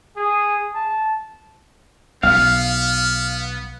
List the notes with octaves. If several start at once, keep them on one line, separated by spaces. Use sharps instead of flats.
G#4
A5
B1 B3 F5